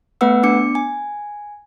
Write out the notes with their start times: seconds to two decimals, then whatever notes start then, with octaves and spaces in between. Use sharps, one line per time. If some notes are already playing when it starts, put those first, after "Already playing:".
0.21 A3 B3 B4 F#5 E6
0.43 B3 D4 D6 C#7
0.75 G#5